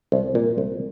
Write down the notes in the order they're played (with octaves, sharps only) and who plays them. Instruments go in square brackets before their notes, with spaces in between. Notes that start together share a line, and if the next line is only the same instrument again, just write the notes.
[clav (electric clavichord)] C2
A#2
C2